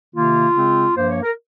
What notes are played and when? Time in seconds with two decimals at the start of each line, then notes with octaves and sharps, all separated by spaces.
0.15 C3 D#3 A#3 F4
0.55 C#3 G#3 C4
0.95 G2 F3 A#3 C5
1.08 C#5
1.23 A#4